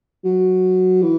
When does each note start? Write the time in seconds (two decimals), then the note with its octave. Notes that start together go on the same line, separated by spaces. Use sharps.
0.25 F#3
1.02 E3